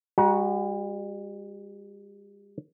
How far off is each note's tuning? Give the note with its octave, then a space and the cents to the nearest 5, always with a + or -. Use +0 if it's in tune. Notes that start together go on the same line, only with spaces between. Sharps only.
G3 +45 F#4 +0 A#5 +40